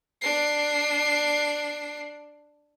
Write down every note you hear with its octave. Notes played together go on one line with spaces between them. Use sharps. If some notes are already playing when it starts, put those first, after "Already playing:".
D4 C7